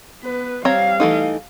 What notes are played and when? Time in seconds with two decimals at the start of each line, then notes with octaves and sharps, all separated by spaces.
0.22 B3 B4
0.65 G3 C4 C#5 F5 A#5
1.00 E3 A3 D#4